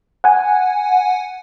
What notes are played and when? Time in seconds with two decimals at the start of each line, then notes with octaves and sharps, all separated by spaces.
0.24 F#5 G#5